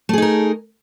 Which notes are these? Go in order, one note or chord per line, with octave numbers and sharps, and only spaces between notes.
A3 D#4 G#4 A#4